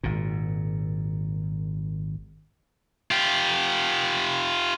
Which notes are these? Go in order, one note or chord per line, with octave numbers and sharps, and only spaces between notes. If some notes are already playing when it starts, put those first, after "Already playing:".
G#1 A#2
F4 G4